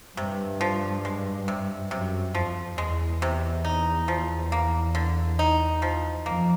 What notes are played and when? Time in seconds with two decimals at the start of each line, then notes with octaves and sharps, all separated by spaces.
0.17 G2 C3
0.61 F3
1.05 G#3
1.48 C3
1.91 F#2 C3
2.35 F2 F3
2.78 E2 G#3
3.22 C3
3.65 D#4
4.08 F3
4.52 A#3
4.95 D3
5.39 D#4
5.82 F3
6.26 F2 A#3